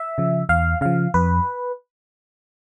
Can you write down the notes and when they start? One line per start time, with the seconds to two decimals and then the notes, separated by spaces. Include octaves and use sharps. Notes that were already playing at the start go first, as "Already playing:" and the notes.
Already playing: E5
0.18 C#3 F3
0.49 E2 F5
0.81 C#3 F3 F5
1.14 F2 B4